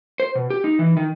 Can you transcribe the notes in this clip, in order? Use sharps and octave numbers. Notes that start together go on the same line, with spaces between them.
C5
B2
G4
D#4
E3
D#3